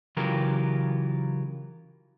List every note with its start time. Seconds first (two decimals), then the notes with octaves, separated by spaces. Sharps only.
0.17 C#3 E3 F#3 F4 G4 A#4